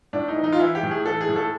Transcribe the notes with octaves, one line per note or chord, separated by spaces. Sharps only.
A2 D4
D#4
E3
D#4
F4
E3 E4
G4
A2
G#4
E3 A4
G#4
A2
A4